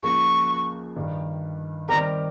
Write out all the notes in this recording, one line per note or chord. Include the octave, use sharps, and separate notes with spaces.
C#2 C#3 F3 A#3 C#6
G2 D#3 G3
D#3 G3 C4 G4 A#4 A#5